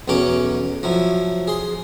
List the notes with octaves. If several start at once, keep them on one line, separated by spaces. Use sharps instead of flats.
B1 E2 F#3 C#4 C#5 D6
F3 F#3 E4
G#4 C6